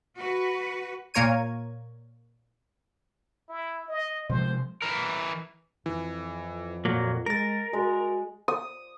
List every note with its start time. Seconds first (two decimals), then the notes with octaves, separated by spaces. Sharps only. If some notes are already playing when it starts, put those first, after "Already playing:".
0.18 F#4 B4
1.14 A#2 A#3 A#4 C#5 G#6 D#7
3.49 E4
3.88 D#5
4.29 C3 F3 G#3 C5
4.82 E3 A#4
5.86 F2 E3
6.85 A#2 F#3 A#3
7.26 G#3 A#4 A6 A#6
7.73 G#3 F#4
8.48 D#6